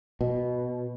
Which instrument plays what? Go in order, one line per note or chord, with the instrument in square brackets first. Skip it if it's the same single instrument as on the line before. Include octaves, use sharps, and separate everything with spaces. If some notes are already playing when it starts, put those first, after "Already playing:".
[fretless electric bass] B2